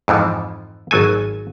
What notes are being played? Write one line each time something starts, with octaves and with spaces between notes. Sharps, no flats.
F2 G#2 E3 F3
G#1 F#3 A4 G#5